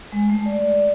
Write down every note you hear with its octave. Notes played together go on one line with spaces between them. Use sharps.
G#3
A3
D5
D5